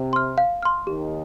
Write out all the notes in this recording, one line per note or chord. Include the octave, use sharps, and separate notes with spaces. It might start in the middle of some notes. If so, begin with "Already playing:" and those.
Already playing: C3
C6 F6
F5
C6 F6
D#2 D#3 G4